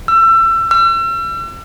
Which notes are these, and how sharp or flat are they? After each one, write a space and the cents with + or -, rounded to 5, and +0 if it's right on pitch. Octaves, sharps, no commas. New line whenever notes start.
E6 +30
E6 +40